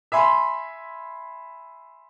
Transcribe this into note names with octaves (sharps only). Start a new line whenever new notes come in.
E5 G#5 B5 C6